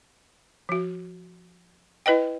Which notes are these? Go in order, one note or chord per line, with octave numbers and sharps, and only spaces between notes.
F3 F#4
E4 B4 D#5 G5